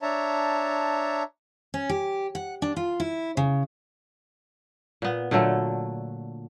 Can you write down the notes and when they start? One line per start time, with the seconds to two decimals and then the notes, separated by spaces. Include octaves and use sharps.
0.02 D4 C#5 E5 A5 A#5
1.74 C#4
1.89 G4
2.35 F#5
2.62 D4
2.76 F4
3.00 E4
3.37 C#3
5.02 A#2 B3
5.31 A#2 D3 F#3 A3